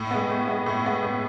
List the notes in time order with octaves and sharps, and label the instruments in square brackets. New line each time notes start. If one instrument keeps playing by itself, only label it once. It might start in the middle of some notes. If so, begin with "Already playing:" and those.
Already playing: [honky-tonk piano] A2
G#3 B3
A2
G#3 B3
A2
G#3 B3
A2